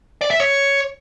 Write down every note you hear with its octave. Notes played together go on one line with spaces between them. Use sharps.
D5
E5
C#5